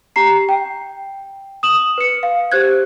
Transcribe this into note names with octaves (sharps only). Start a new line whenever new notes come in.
G4 A#5 C7
G5
D#6 E7 F#7
B4 C#7
F5
G4 C5 F#6 G#6